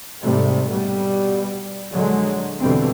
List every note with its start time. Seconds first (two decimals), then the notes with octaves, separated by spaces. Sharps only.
0.22 G#2 C3 G3 A3
0.70 B2 G3
1.93 A#1 D3 F#3 G#3
2.60 E2 B2 D3 G3 C4